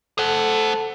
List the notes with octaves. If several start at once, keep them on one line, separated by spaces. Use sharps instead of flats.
A4 C5 F#5